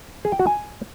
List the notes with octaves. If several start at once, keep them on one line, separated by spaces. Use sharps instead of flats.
G#4
G5
F#4
G#5